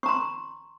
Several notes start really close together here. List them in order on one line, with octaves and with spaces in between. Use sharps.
C#6 A#5 C6